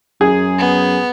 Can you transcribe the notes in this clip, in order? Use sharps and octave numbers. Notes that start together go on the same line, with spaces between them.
F#2 G#4
B3